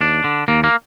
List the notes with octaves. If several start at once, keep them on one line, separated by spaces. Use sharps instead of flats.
D#2 D4
D3
D#2 A#3
A#3